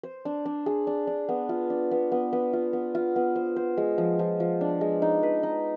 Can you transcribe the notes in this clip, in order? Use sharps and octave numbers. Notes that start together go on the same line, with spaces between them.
C5
D4
D4
G#4
D4
D4
B3
F4
D4
B3
B3
B3
F4
B3
F4
B3
C5
C5
G#3
F3
F3
F3
D4
G#3
D#4
B4
D#4